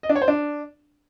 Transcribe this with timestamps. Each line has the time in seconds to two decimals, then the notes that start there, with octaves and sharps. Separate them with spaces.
0.03 D#5
0.09 D4
0.16 C#5
0.22 C5
0.28 D4